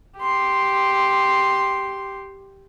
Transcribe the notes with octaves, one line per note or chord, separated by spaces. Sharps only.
G4 C6